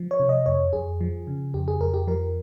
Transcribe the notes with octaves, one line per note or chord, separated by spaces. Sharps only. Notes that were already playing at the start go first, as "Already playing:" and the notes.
Already playing: F3
C#5
C3
D#5
F2 C#5
F2 G#4
F3
C#3
F2 G4
G#4
F2 A#4
G4
F3 A#4